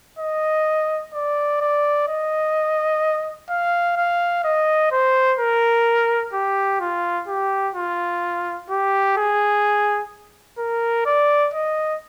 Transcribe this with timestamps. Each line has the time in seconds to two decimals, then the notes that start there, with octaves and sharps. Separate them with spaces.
0.19 D#5
1.13 D5
1.61 D5
2.08 D#5
3.50 F5
3.97 F5
4.44 D#5
4.92 C5
5.39 A#4
6.33 G4
6.80 F4
7.28 G4
7.75 F4
8.70 G4
9.17 G#4
10.58 A#4
11.06 D5
11.54 D#5